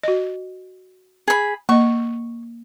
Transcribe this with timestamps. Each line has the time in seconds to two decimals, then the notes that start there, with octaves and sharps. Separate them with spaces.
0.03 F#4 D#5
1.28 G#4 B5
1.69 A#3 D#5 C#6